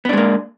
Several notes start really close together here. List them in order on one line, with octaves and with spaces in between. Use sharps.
B3 D4 G#3 A#3